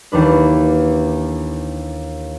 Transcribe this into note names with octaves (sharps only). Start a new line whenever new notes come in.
D#2 E3 D4 B4